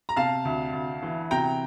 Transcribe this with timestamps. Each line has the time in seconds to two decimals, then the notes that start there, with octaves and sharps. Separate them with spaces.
0.09 A#5
0.16 C3 F5 A5
0.45 D2
0.73 D2
1.02 E3
1.31 C3 G5 A#5